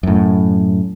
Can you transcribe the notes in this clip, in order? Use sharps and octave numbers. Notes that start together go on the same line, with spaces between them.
F#2 A2